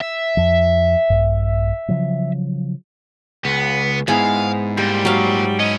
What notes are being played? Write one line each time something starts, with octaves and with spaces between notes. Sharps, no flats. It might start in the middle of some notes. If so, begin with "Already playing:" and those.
E5
F2 F3
A#1 G2
C#3 F3 F#3
C#2 B3
G#2 B3 E4 G#4 F5
A#2 G3 C5
F#3 F5
C#4 E4 D#5